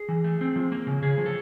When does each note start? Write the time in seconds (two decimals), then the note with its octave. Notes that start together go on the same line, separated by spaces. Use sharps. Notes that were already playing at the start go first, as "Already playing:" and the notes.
Already playing: G#4
0.09 E3
0.24 A3
0.41 C4
0.56 F3
0.72 A#3
0.87 C#3
1.02 C#3 G#4
1.18 F3
1.26 A4